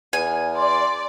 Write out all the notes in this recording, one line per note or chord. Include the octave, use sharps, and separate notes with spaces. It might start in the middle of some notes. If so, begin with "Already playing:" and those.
E2 G#5
D5 C6